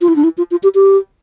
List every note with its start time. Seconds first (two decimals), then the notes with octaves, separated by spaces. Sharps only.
0.01 F4
0.08 E4
0.16 D4
0.24 E4
0.38 F4
0.51 F4
0.63 G4
0.75 G4